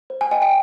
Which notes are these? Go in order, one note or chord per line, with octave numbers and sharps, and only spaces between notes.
C5
G#5
D#5 G5 G#5
G5